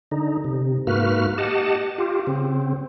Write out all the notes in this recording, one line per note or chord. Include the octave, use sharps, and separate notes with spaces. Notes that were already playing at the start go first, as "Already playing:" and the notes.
D3 D#4
C3
G#2 A#3 F#4 B4 F6
G4 D#5 F#5 A5
F4 G4
C#3 C4